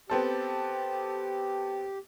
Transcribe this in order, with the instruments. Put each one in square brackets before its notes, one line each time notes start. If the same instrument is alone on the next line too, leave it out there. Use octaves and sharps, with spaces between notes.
[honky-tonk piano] B3 C4 A4 [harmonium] G4